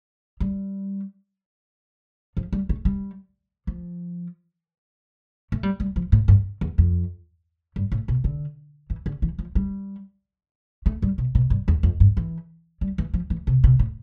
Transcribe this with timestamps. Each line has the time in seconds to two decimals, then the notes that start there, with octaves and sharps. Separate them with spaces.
0.40 G3
2.37 F3
2.53 G3
2.69 A3
2.85 G3
3.67 F3
5.52 A3
5.63 G3
5.80 G3
5.96 F3
6.12 A2
6.28 G2
6.61 E2
6.78 F2
7.76 G2
7.92 A2
8.08 B2
8.24 D3
8.90 E3
9.06 D3
9.22 E3
9.39 F3
9.55 G3
10.86 A3
11.02 G3
11.18 B2
11.35 B2
11.50 G2
11.68 E2
11.83 F2
12.00 G2
12.17 E3
12.81 G3
12.98 E3
13.14 F3
13.30 E3
13.47 C3
13.64 B2
13.79 A2